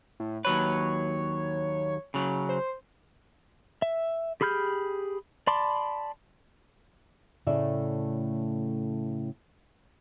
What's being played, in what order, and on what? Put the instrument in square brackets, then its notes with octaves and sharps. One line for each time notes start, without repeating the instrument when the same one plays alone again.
[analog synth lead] A2
[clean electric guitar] D#2 F#3 B4 [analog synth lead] C#5
[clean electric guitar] C#3 F#3
[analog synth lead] C5
[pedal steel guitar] E5
G4 G#4 B5 F6 G6
D5 A5 B5 C6 D6
[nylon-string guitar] A2 C#3 A3 D5 E5